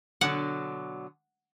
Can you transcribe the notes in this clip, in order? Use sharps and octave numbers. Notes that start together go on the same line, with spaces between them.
B2 D3 F#3 F#5